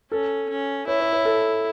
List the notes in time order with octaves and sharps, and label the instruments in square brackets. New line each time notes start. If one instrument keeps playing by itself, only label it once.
[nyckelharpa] C#4 [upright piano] A4
[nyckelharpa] C#4
[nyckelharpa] E4 [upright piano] C#5
[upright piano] C#5
C#5
A4